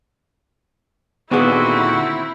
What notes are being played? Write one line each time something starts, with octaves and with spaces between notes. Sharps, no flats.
D#2 A#2 D3 B3 C4 E4 F#4 G#4